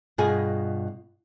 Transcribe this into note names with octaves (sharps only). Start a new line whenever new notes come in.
G2 B2 F4 G#4 D#5 G#5